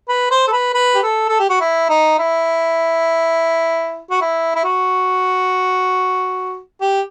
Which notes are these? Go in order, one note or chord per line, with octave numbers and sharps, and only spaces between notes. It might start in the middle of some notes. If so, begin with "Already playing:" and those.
B4
C5
A4
B4
B4
G4
A4
A4
G4
F#4
E4
D#4
E4
F#4
E4
E4
F#4
G4